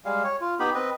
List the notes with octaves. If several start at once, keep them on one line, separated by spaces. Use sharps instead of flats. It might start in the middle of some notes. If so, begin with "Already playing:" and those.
G3 G#3 F5
C#5
F4
B3 D#4 G4 B5
C4 B4 D#5